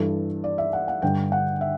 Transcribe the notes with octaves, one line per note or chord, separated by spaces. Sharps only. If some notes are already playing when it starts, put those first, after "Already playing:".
Already playing: G2 E3 A4
D5
E5
F#5
F#5
G2 D3 G5
F#5
E5